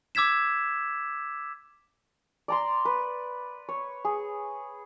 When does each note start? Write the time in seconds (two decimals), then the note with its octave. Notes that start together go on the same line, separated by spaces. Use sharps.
0.15 D6 E6 G#6 B6 E7
2.48 D5 A#5 C6
2.85 B4
3.69 C#5
4.05 G#4